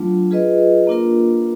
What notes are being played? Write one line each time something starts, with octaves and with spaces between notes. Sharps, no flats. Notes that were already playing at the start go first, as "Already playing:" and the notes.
Already playing: F#3 A3 D4 F4
F4 G#4 B4 D#5
A#3 D4 F4 A#4